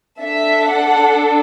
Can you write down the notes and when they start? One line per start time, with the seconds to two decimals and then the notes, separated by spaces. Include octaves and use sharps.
0.20 D4 A4 E5
0.67 F#5